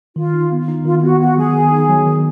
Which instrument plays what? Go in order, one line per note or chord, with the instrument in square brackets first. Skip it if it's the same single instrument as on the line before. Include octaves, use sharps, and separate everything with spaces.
[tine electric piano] D#3 [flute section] F4
[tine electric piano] D#4
B3
D#4
[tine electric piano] D#3 [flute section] F4
[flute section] F4
[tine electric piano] B3 [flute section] F#4
[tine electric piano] B3 [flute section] F#4
[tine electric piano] F#3 [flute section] G#4
[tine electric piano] D#3
D#4
F#3
D#3